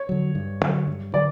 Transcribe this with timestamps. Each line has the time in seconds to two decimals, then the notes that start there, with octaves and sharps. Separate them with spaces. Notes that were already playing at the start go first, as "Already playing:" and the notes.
Already playing: C#5
0.09 D3 F#3
0.35 G2
0.62 D3 F#3
0.87 G2
1.14 D3 F#3 D5